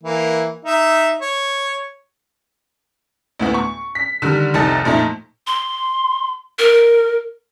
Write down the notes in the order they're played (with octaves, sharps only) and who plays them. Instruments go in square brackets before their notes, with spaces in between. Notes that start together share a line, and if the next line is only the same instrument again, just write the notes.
[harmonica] E3 A#3
D#4 E5
C#5
[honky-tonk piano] D2 A2 B3
C#6
B6
D3 D#3 G3
F1 C2 D#4 A4 A6
F2 A#2 A3 D#4
[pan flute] C6
A#4